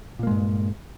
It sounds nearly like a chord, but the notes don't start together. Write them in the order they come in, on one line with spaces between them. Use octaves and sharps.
A#2 A#3 G#3 G2